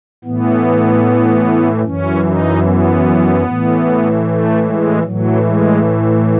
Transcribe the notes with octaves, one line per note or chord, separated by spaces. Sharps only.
A2 E3 B3
F#2 E3 C#4
D#4
B3
A2 E3
A3
G#3
A2 E3 F#3
G#3